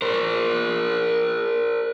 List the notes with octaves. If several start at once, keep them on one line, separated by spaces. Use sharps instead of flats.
A#4 C5